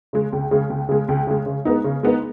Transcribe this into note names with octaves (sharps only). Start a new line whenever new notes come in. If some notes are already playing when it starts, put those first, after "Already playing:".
C#3 G#3
C#2
C#3 G#3
C#2
C#3 G#3
C#2
C#3 G#3
C#3
G#3 B3 D#4
C#3
G#3 B3 D#4